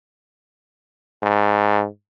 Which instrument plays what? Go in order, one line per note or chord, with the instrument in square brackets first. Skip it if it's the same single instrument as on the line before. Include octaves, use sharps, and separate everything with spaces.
[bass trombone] G#2